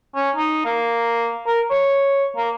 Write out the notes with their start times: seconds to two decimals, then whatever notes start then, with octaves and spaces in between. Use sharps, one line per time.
0.15 C#4
0.36 D#4
0.65 A#3
1.47 A#4
1.71 C#5
2.37 A#3